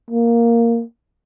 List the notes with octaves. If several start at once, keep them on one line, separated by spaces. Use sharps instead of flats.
A#3